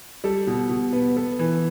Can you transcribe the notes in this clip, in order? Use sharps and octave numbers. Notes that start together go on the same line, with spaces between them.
G3 A4
B2
B2
B3
B3 A4
E3 B4